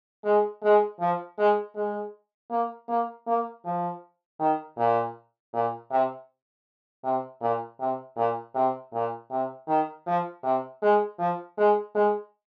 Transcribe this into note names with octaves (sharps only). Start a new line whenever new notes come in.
G#3
G#3
F3
G#3
G#3
A#3
A#3
A#3
F3
D#3
A#2
A#2
C3
C3
A#2
C3
A#2
C3
A#2
C3
D#3
F3
C3
G#3
F3
G#3
G#3